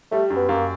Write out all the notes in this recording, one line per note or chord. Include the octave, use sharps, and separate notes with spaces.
G3 A3
F#2
B3
F#2 A#3